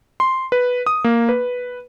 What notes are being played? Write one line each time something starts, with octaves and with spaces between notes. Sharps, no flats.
C6
B4
D#6
A#3
B4